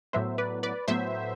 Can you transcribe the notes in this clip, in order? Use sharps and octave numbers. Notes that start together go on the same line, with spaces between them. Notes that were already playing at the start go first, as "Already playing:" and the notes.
A2 F#3 B3 C5 E5
B4 D5
B4 D5
A2 F#3 B3 C5 E5